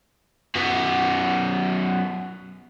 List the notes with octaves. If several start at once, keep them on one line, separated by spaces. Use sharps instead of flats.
F#2 B3